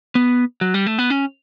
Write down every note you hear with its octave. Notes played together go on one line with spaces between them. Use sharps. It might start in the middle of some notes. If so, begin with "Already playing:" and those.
B3
F#3
G3
A3
B3
C#4